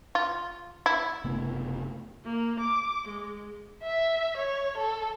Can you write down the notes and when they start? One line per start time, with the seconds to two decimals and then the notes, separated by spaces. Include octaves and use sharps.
0.15 F4
0.86 E4
1.24 F#1 C3 A3 B3
2.24 A#3
2.60 D6
3.08 G#3
3.83 E5
4.37 C#5
4.78 A4